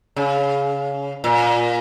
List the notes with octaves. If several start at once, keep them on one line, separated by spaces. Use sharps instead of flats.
C#3
A#2